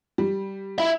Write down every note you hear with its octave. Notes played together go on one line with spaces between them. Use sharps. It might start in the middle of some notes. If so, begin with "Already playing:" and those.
G3
E4 E5